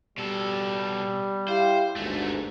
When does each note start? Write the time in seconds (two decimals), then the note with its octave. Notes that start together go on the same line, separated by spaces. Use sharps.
0.18 B2 G3 A4
1.48 E4 G4 C5 F5
1.96 G1 D2 G#2 G#3 A3